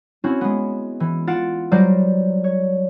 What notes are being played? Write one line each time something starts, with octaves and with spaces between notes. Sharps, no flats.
C4 C#4 E4 F#4
G#3 B3
E3
F4 F#5 A6 D7 E7
F#3 G3 A#4 C5 D5
C#5